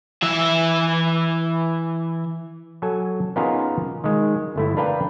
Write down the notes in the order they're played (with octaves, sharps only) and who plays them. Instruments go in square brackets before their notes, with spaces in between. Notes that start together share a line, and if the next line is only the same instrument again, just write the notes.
[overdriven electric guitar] E3 E5
[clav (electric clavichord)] F#3 A4 G#5
B3 C#4 D#4 F4 G#4 A#4
D#3 G#3
G1 A3 E4
D4 A#4 B4 F5 G5